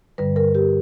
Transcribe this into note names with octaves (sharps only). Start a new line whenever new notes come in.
G2 D3 G3 B4
A#4
G4